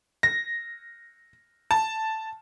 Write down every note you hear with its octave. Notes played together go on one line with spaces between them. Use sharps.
A#6
A5